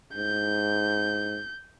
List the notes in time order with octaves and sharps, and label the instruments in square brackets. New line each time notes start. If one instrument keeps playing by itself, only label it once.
[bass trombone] G#2 [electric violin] G6